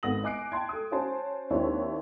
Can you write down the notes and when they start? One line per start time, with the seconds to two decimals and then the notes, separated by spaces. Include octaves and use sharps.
0.03 G#1 B3 A4 D#6 A#6 F#7
0.23 D#5 G#5 D6 F#6 C7 D7
0.52 G5 A5 C6 G#6
0.69 A4 D#6
0.91 C#4 F#4 C5 G#5 A5 C6
1.51 D#2 C4 D4 E4 C#5